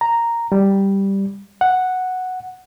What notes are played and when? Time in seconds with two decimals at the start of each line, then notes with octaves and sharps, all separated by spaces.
0.01 A#5
0.52 G3
1.61 F#5